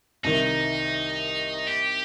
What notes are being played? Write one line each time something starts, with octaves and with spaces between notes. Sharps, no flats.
C2 C3 D#3 D#4
G4